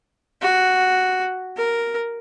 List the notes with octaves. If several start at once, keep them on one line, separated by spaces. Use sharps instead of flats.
F#4
A#4